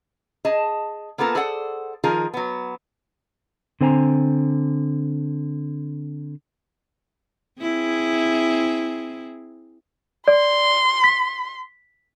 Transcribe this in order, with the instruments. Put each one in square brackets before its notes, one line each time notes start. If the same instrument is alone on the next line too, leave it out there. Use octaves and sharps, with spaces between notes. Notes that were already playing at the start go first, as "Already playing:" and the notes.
[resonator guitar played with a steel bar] G#4 D#5 A5
A#3 B3 F4 A4 A#4
G#4 A4 C5 D5 F#5
D#3 F3 F4 G#4 A#4
F#3 B3
[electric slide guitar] D3 C4 C5 G#5 A#5
[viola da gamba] C4 E4 G#4
[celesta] D5 [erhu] C6
[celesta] B6